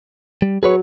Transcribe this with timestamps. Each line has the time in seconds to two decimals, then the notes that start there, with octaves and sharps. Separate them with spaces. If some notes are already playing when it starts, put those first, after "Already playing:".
0.42 G3
0.63 F#3 G#4 B4 C#5